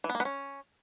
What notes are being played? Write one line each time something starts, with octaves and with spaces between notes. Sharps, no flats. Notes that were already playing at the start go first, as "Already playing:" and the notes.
E3
B3
A#3
B3
C#4